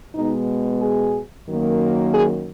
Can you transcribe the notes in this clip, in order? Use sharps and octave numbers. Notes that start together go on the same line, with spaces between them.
B2 G#3 B3 D#4
G#4
F#2 D#3 F#3 A#3
G#4